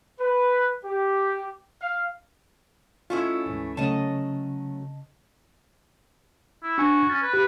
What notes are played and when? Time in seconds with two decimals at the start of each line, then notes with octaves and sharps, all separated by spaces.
0.20 B4
0.85 G4
1.82 F5
3.10 A3 C#4 E4 F4 D#5 E5
3.46 D2 G#2 E3
3.77 C#3 F#3 A3 C#4 D#5 A5
6.62 E4
6.78 D4 F#4 G#5 G#6
7.10 C#4 A6
7.22 B4
7.33 G4 B4